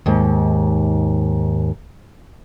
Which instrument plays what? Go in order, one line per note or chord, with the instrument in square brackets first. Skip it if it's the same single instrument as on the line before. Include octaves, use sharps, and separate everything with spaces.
[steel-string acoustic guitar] D#2 G#2